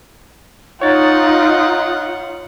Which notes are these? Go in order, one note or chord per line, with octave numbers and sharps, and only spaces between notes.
D#4 F4 C#5 F#5 A6